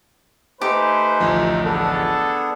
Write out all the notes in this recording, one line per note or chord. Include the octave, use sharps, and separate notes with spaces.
A3 D#4 G4 B4 C5 G#5
A1 D2 F3
B3 D4 G#4 A4